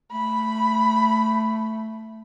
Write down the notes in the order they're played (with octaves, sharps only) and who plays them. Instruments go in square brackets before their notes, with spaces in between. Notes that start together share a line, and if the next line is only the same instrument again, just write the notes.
[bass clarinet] A3 [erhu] B5